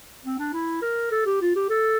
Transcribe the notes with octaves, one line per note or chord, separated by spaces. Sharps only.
C4
D4
E4
A#4
A4
G4
F4
G4
A4